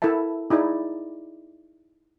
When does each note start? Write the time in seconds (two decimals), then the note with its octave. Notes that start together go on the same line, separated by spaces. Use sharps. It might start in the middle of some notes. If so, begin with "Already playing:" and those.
0.02 E4 A4 A#4 E5 A5
0.50 D#4 E4 G#4 D5